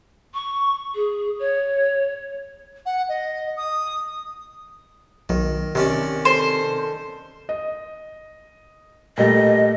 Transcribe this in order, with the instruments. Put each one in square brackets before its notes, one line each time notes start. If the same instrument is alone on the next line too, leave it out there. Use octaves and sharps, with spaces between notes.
[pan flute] C#6
G#4
C#5
[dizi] F#5
D#5
D#6
[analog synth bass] B1 [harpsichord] D#3
[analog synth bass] C3 [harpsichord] D#3 C#4 D4
[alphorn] A4 [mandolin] C5
[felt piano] D#5
[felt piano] A#2 G3 A3 [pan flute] D#5